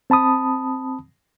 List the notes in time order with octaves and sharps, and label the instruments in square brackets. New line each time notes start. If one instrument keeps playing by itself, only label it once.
[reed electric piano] C4 A5 B5 D#6